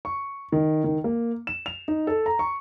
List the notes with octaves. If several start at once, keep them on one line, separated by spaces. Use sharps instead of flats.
C#6
D#3
D#3
A#3
E7
F7
D#4
A4
A#5
C#6